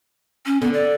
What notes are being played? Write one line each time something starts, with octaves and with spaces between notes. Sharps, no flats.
C#4
D3 B3
D5